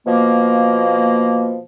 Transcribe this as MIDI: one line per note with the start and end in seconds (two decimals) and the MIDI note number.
0.05 1.59 47
0.05 1.59 53
0.05 1.59 58